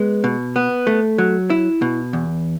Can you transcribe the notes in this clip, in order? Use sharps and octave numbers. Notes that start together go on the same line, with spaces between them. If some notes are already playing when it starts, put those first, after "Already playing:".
Already playing: G#3 B3
B2
B3
A3
F#3
E4
B2
E2